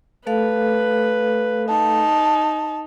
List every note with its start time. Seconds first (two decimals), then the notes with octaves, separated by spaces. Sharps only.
0.27 A3 A4 B4 F5
1.69 D#4 A5